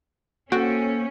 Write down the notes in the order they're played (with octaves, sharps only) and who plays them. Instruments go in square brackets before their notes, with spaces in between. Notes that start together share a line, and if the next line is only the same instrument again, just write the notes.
[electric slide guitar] A#3 C5 G5 [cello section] C#4 [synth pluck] F#4 [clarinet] A4